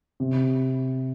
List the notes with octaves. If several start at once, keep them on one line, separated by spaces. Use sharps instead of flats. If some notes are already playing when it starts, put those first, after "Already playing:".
C3